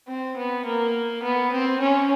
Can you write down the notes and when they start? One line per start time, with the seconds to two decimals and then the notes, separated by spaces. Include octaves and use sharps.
0.08 C4
0.37 B3
0.65 A#3
1.23 B3
1.52 C4
1.80 C#4